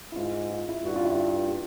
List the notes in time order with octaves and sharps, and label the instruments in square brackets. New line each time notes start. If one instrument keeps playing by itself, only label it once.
[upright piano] E4
[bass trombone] G#2 [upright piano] F4
[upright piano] F4
E4
[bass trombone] G2 [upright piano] F#4
[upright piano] F4
E4
F4
G4